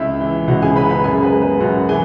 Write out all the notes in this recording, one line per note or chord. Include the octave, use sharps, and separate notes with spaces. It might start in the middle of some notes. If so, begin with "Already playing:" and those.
Already playing: C#2 E4 E5
E3
C#2 F#4 F#5
G#4 G#5
C#3 B4 B5
B4 B5
F#2 G#4 G#5
B4
G#3
B4
F#2 F#4 F#5
E3 G#4 G#5